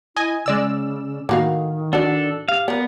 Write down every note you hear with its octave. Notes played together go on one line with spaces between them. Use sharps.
E4 D#5 G#5
C#3 G#3 D5 E6
A2 D#3 A#3 F#4 F5
D4 F#4 A4 D5
G4 F5
B3 A#4 D5